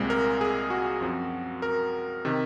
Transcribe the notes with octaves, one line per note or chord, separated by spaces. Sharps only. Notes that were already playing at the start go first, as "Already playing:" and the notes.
Already playing: C2 A#2 G#3 C4
A#4
G#4
F#4
F#2 F3 C4
A#4
C3 D#3